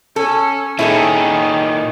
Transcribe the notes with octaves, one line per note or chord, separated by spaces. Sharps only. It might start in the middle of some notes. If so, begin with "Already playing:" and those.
C#4 A4
A#2 D#3 C#4 E4 G#4 A4